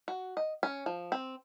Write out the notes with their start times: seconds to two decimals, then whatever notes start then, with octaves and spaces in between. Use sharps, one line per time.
0.08 F#4
0.37 D#5
0.63 C#4
0.86 F3
1.12 C4